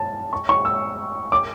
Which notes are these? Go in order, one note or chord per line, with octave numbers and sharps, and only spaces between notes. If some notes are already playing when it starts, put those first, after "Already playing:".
Already playing: A5
C#6
C#6
E6
D6